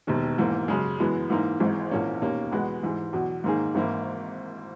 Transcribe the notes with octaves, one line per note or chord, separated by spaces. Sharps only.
E1 D#2 D#3
G#2 E3 A#3
F#2 C#3 G#3
F#2 E3 G#3 B3
G#2 E3 A#3 D#4
G#1 G#2 E3 G#3 D#4
A#1 G#2 E3 A#3 C#4
E1 D#2 D#3 A#3 C#4
E2 B2 G#3 B3 F#4
G#2 E3 G#3
E2 B2 F#3
G#2 D#3 A#3 D#4 G#4
G#1 G#2 E3 A#3 E4